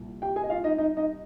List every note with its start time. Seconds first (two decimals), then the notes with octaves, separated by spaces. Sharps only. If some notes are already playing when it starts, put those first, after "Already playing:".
Already playing: C2 A#2
0.22 G4 G5
0.36 G#4 G#5
0.43 D#5
0.50 F4 F5
0.64 D#4 D#5
0.78 D#4 D#5
0.97 D#4 D#5